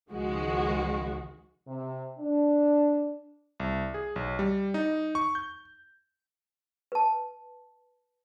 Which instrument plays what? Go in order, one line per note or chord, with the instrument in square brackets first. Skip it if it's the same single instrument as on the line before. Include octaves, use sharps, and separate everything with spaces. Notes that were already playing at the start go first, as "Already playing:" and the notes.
[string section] C#2 D#3 F3 G#3 F#4
[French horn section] C3
D4
[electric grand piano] C2
G#4
B1
G3
D#4
C#6
G6
[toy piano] B4 A5